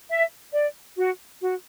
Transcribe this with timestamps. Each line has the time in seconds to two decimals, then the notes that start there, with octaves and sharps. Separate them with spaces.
0.09 E5
0.53 D5
0.96 F#4
1.40 F#4